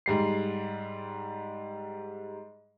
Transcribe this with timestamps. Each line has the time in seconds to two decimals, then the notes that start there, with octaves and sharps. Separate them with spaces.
0.06 G#2 G3 C7